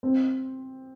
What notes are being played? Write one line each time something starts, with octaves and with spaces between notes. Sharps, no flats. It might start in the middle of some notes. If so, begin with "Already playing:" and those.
C4